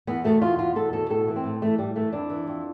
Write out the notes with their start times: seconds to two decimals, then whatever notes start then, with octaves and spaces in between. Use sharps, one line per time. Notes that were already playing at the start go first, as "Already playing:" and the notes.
0.07 E2 B3
0.24 B2 A3
0.41 E2 F4
0.58 B2 F4
0.76 E2 A4
0.93 B2 A4
1.10 A2 A4
1.28 E3
1.36 C4
1.44 A2
1.62 E3 A3
1.78 A2 G3
1.96 E3 A3
2.12 F2 D4
2.30 E3
2.47 F2